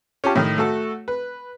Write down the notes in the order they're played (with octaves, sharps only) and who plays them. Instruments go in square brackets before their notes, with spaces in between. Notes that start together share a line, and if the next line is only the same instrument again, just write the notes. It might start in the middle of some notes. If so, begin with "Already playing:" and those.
[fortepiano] C#4 F4 G4 A5
A2 D#3
A3 F#4 A4
B4